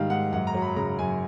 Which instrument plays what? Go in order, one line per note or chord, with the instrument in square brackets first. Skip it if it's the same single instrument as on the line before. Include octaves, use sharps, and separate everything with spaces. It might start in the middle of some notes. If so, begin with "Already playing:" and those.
Already playing: [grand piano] G#2 D#3 G3 F5
G#2 F#5
F#2 F#5
A#5
F#3
B5
C#3 A#5
F#2 G#5